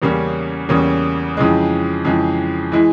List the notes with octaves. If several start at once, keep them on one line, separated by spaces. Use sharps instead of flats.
E2 C#3 G3 A#3 C#4
E2 C#3 G3 A#3 C#4
F2 C#3 E3 G#3
F2 C#3 E3 G#3
E3 G#3 E4